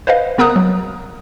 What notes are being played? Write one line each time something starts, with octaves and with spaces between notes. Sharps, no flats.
B4 C5 D#5 F5
C#3 B3 A#4 A#5 D#6 F#6
F#3